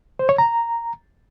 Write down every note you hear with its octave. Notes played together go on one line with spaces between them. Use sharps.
C5
C#5
A#5